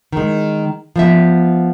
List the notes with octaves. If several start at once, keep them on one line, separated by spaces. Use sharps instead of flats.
D#3 G#3
F3 B3 E5